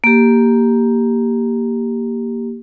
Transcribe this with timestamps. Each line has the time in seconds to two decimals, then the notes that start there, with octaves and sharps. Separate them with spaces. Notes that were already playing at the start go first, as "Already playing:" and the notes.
0.04 A#3 G4